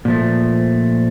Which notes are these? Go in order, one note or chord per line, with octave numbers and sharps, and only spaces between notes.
A#2 F3 A3